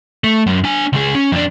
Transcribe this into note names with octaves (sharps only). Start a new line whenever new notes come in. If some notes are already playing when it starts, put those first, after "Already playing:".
A3
F#2
D4 G#5
C#2 G#4
C#4
F2 D4